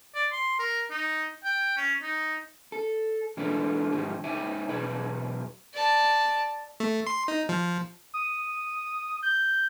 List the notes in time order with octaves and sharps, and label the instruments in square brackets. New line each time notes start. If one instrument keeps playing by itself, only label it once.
[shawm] D5
C6
A#4
D#4
G5
C#4
D#4
[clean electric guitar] A4
E3 G#3 D4 F4 A4 B4
G#2 D#3 F3 G#3 G4
G#3 D#4 C#5 E5 G5 G#5
B1 E2 G#4 B4 D5
[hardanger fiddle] D5 A5
[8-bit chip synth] A3
C6
D#4
F3
[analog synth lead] D#6
G6